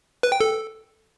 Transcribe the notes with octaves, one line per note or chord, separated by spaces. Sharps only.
B4
G5
A4